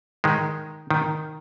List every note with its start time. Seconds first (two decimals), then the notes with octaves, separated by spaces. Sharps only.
0.24 D#3 G#3
0.91 D#3